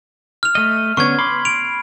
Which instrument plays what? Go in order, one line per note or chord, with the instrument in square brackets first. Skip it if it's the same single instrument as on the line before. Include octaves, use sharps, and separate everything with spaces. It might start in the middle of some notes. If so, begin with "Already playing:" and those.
[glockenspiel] F6 F7
[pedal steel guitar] A3 D#5
[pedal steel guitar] D3 B3 C#4 [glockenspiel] C#6 G#6
[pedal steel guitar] B5 C6 D6
[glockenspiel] D7 F7